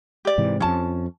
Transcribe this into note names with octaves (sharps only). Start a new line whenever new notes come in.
G4 D5
G#2 C3 E3
F2 F3 C#4 A5